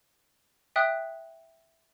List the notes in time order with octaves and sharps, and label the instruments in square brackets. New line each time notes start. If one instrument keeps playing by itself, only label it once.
[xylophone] E5 G5 D#6 F#6